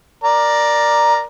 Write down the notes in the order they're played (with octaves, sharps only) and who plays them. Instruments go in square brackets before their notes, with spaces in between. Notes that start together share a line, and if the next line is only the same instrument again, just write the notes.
[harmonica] A#4 D5